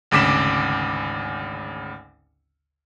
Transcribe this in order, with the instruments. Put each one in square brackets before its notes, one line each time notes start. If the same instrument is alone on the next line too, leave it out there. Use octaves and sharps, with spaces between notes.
[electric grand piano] G#1 D2 C#3 D6 B6 E7